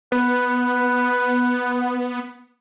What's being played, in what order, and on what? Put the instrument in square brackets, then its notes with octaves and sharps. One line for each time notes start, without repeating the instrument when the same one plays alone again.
[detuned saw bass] B3 [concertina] B4